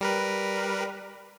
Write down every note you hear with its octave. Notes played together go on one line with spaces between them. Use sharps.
G3 A#4 B4